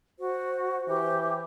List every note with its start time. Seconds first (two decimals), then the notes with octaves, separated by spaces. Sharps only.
0.19 F#4 C5
0.88 E3 G4